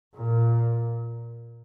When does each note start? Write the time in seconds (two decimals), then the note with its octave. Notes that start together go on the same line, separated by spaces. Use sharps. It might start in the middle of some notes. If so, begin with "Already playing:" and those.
0.15 A#2